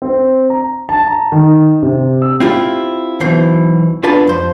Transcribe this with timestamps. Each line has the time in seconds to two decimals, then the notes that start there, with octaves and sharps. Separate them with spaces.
0.02 C4
0.50 A#5
0.89 A5
1.07 A#5
1.32 D#3
1.83 C3
2.22 E6
2.40 C4 E4 F4 G4
3.20 B1 B2 E3 C5
4.03 B3 D4 F4 B4 A5
4.27 F2 C5